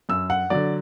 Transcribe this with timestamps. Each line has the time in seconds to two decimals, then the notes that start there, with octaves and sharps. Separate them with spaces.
0.09 F#2 E6
0.30 F#5
0.50 D3 F#3 D5